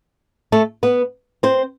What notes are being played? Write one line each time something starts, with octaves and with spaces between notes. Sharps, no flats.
A3 A4
B3 B4
C4 C5